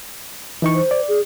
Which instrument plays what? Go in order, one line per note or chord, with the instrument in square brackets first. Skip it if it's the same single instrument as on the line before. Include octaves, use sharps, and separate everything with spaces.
[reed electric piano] E3 D#4 C#6
[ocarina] C5
[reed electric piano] D5
[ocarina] G#4